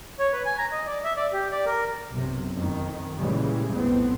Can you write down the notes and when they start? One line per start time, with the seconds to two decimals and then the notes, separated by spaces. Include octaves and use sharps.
0.19 C#5
0.32 B4
0.46 G#5
0.58 A#5
0.72 D#5
0.87 D5
1.04 E5
1.17 D5
1.33 G4
1.52 D5
1.66 A#4
2.11 B1 F#2 C3
2.54 F2 D#3
3.19 A#2 C#3 E3 G3 G#3
3.72 B1 F2 A2 B3 C4